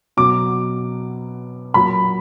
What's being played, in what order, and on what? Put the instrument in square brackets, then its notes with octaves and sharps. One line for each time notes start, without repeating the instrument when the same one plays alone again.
[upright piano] B2 F#3 B3 D6
A#2 F#3 A#3 B5